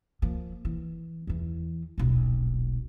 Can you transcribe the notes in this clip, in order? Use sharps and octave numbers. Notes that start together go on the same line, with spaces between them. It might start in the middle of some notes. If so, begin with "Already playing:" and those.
F3 A#3
E3
E2 E3
D#1 B1